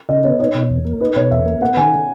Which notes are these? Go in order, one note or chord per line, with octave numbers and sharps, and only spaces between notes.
C#3 D#5
B3 C#5
D#4 C#5
B2
E2
A#3
D#4 B4
B2 C#5
E2 E5
A#3
B3 F#5
D#3 G#5